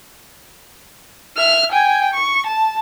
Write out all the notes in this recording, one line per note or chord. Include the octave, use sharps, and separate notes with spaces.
E5 F6
G5 G#5
C#6
A5